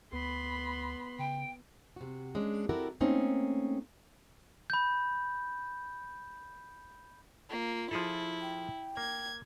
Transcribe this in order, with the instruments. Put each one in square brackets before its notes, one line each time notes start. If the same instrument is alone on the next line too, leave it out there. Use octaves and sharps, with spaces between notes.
[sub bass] D2 [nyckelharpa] B3 [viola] B5 C6
[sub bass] C#3 [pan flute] G5
[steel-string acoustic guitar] C3 F#4
G#3 C#4 D4
C4 E4 F#4 G4 A4 A#4
A3 A#3 C4 C#4 D#4
[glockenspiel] B5 G6
[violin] A#3 [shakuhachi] F4
[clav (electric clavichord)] F3 G#4 A4 [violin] E4
[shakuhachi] G5
[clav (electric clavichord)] A#3 [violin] G#6